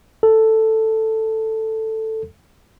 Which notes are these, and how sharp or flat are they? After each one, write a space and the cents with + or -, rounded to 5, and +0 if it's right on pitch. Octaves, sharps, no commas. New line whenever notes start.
A4 +5